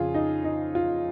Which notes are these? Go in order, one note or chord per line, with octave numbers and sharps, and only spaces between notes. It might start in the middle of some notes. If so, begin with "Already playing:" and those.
Already playing: F2 C#3 F3 F4 G#4
D#4
D#4
F4